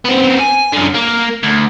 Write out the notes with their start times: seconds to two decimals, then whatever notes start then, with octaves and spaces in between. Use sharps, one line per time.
0.05 B3 C4
0.39 G#5
0.72 F#2 D3
0.94 A#3
1.43 D2